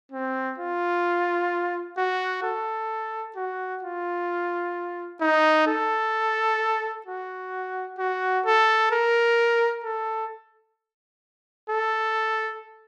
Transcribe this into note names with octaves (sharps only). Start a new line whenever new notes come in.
C4
F4
F#4
A4
F#4
F4
D#4
A4
F#4
F#4
A4
A#4
A4
A4